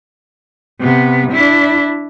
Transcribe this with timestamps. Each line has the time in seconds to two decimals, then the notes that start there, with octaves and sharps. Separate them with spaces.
0.80 C3 B3
1.32 D4 E4